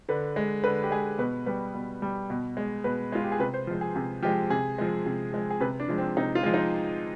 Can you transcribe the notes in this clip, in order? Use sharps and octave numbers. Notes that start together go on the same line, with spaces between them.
D3 B4
G#3
D3 B4
G4
G#3 G#4
B2 B4
G3 B4
B2
G3
B2
G#3
B2 B4
G#3 F4
G4
G#4
C3 B4
C5
F3 G#3
G#4
C3 G#4
F3 G#3 G4
C3 G#4
F3 G#3
C3
F3 G#3
G#4
C3 B4
D4
F3 G#3
C4
C3 D#4
F4
F3 G#3
D#4